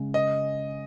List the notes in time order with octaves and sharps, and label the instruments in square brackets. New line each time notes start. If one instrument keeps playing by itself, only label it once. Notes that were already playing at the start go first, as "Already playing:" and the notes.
Already playing: [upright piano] C#3 G#3
[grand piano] D#5